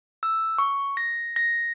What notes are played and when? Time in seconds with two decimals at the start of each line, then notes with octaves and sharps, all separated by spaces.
0.23 E6
0.58 C#6
0.97 A#6
1.36 A#6